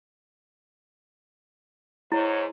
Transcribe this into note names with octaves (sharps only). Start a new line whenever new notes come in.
G#2 E4 C#5